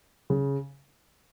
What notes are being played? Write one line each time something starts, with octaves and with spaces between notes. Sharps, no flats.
C#3